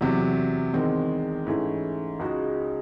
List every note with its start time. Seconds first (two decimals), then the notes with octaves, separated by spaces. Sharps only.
0.01 E2 C3 F#3
0.73 E2 D#3 G#3 C4
1.47 G#2 E3 A3 C#4 E4
2.19 C#2 C#3 G#3 D#4 F#4